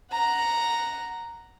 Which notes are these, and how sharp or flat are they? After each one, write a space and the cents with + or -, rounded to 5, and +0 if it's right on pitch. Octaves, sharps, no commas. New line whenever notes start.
F#5 +0 A#5 +0